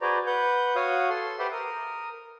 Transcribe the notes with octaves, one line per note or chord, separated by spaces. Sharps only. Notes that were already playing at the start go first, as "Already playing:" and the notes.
F#4 G#4 B4 C5 D5 A#5
B4 F#5 G6
F#4 C#5 F5 F#5 D#6
A4 C6
G4 B4 C5 E5 F#5 C6
A#4 D#6